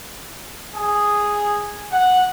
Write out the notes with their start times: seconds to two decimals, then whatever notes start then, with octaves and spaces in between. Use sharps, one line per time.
0.76 G#4
1.91 F#5